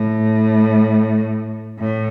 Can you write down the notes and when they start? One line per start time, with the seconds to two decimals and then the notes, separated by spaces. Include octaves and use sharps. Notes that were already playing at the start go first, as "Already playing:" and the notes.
Already playing: A2
1.79 A2